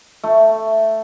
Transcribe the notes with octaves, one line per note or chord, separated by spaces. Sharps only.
A3